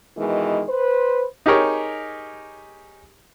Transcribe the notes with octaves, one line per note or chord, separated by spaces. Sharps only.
B2 D#3 E3 G#3
B4 C5
D#4 G4 G#4 A#4 C#5